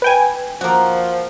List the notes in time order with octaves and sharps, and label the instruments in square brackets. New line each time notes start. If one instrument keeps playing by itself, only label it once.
[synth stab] B4 G5 G#5
[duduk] F3 [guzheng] A#3 F#4